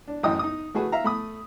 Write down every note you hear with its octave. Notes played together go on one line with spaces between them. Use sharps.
D4
A1 F#2 E4 D#5 G5 D#6
D#4 D#6
A3 F#4 G#4 B4
E5 F5 A#5
A3 B5 D#6